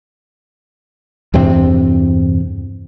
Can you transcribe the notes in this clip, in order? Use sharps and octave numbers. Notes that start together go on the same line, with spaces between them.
E2 G2 C3 C4